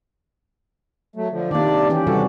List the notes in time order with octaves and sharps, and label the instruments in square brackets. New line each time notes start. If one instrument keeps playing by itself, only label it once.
[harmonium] F#3 A3
D3 F3
[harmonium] C3 D4 D5 [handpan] D#3 A#3
[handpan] E3 C#4 G4
[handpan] C3 G3 F#4 [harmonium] A4